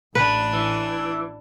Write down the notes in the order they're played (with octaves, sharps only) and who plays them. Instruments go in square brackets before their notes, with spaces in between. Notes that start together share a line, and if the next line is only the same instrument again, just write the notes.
[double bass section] A1 [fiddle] D4 [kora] B4
[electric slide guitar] E3